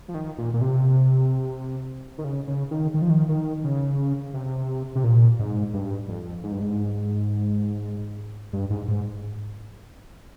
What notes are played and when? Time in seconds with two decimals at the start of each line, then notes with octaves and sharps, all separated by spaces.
0.08 F3
0.14 D#3
0.38 A#2
0.54 A#2
0.61 C3
2.18 D#3
2.24 C#3
2.47 C#3
2.71 D#3
2.94 D#3
3.02 F3
3.10 D#3
3.29 D#3
3.64 C#3
4.34 C3
4.95 C3
5.04 A#2
5.39 G#2
5.74 G2
6.09 F2
6.44 G#2
6.52 G2
6.61 G#2
8.53 G2
8.70 G#2
8.88 G#2